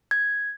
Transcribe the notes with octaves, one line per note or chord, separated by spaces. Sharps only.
G#6